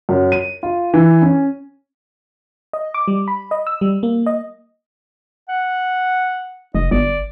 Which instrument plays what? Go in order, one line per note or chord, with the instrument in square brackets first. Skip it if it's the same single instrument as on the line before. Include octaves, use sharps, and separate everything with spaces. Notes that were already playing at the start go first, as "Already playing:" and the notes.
[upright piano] F#2
D#7
F4
E3
C#4
[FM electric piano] D#5
D6
G3
B5
D#5
E6
G3
A#3
D#5
[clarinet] F#5
[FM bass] F1 [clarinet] D#5
[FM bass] G1 [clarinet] D5